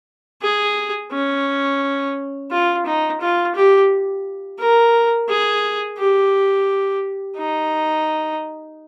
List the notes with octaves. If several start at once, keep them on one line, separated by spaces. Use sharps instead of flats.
G#4
C#4
F4
D#4
F4
G4
A#4
G#4
G4
D#4